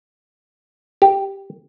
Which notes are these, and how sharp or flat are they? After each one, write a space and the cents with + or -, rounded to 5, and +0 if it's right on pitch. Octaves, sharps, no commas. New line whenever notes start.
G4 +0